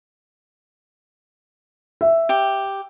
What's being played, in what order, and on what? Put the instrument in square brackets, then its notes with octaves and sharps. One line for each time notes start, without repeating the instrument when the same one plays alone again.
[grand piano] E5
[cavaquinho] G4